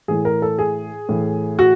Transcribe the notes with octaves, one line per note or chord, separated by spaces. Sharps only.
A2 E3 G#4
A#4
A4
G#4
A2 E3
F#4